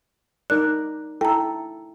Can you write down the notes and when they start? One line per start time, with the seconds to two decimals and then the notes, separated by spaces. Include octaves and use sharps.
0.50 D#4 A#4 D5 F#6
1.21 E4 A4 G5 A#5